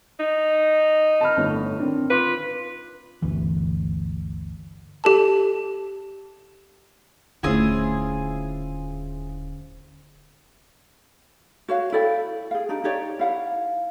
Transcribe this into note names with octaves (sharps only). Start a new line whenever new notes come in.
D#4
A5 B5 F6
G1 A2 C#5
D#3 C4 D4
F4 B4 C6 D6
G1 D2 E3
G4 A4 A5
D#1 D3 A3 C#4 E4 F4 G#4 C5
F#4 C#5 F5
E4 A4 D5 G5
G#4 F5
D4 D#4 G4
D#4 G4 C#5 D5
E4 F5 F#5